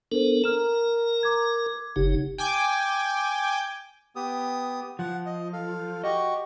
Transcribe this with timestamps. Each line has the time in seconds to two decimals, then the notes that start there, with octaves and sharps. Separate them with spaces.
0.12 B3 D4 A4 A#4 C5
0.44 A#4 A#5 F6 E7
1.23 D6 G#6
1.96 F#1 C#3 D#4 G4
2.38 G5 G#5 D6 G6
4.16 B3 G4 D#6
4.99 F3 F#5
5.26 D#5
5.53 A4 F5
6.04 F#4 G4 D#5 C#6